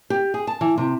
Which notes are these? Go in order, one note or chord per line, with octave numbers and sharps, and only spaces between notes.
G4
G#4
A5
E3
C3